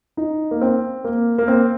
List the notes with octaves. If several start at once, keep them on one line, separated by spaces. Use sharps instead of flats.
D#4
A#3
C4
A#3
A#3
C4